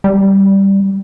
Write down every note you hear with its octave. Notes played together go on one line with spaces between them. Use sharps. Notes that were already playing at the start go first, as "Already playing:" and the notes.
G3